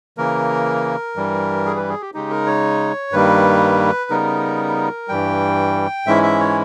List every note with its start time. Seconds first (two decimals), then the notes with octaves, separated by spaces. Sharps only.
0.18 C#3 E3 A#3 A#4
1.16 G2 E3 G3
1.66 G#4
1.77 B4
1.89 G#4
2.01 G4
2.14 C#3 G#3 D#4 G4
2.31 A#4
2.47 C#5
3.12 G2 D#3 G3 A#3 B4
4.10 C#3 G3 B3 D#4 A#4
5.08 G2 E3 G3 G5
6.06 G#2 E3 G#3 C#4 E4 E5
6.23 E5
6.40 C#5